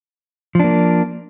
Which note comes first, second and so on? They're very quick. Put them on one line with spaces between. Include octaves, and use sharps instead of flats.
F3 D4 A#3